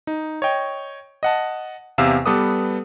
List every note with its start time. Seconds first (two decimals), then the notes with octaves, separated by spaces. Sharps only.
0.07 D#4
0.42 C#5 D#5 G5
1.23 D#5 F#5 A5
1.98 E2 C3 E5 F5 E6 E7
2.26 G3 B3 A4 B4 D6 D#6